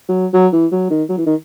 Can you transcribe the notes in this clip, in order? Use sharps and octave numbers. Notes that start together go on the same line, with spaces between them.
F#3
F#3
E3
F#3
D#3
F#3
E3
D#3